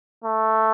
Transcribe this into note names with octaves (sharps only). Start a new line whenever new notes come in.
A3